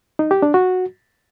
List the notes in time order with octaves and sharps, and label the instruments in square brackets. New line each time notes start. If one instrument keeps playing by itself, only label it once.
[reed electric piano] D#4
G4
D4
F#4